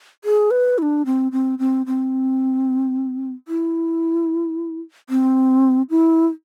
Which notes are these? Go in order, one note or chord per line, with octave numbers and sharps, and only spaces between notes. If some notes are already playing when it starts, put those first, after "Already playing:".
G#4
B4
E4
D4
C4
C4
C4
C4
E4
C4
E4